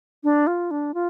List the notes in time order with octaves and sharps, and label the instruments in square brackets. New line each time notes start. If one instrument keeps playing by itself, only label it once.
[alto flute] D4
F4
D4
F4